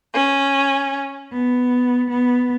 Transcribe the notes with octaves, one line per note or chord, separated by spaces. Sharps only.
C#4
B3
B3